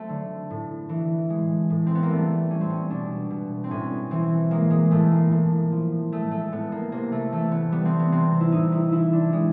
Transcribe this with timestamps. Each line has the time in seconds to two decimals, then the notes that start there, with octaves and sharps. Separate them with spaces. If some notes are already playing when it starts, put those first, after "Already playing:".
Already playing: F#3 A3 C4
0.09 D3
0.50 A2
0.89 E3
1.30 G#3
1.70 A2
1.86 C4
1.95 B3
2.03 A#3
2.10 G3 A3
2.51 G3 C#4
2.61 C4
2.70 C#4
2.90 B2 D4
3.30 B2
3.64 C4
3.70 A2 C#4
4.11 E3 C4
4.51 G#3 A#3
4.71 G#3
4.91 A2 A3
5.11 A#3
5.32 A2
5.72 F3
6.12 G#3 A3
6.31 A3
6.52 A2 B3
6.72 A#3
6.92 C3 A#3
7.12 A3
7.32 E3 A3
7.52 B3
7.72 G3 B3
7.85 C4
7.99 B3
8.12 C3 C4
8.40 E4
8.52 A2 D#4
8.72 E4
8.92 E3 E4
9.13 D4
9.32 G3 G#3